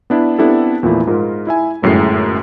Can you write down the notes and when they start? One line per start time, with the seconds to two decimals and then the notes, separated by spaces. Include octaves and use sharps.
0.10 B3 D4 E4
0.38 B3 C4 D4 E4 G4 A4
0.83 E2 A#2 F3 A3 E4
1.07 G#2 F4 A#4
1.47 E4 E5 G#5
1.83 G1 F#2 A2 G#3 C7